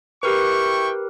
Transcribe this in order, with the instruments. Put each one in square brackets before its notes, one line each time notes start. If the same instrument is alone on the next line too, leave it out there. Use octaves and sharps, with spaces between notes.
[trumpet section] E4 G5 C#6 [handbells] G4 A#4 B4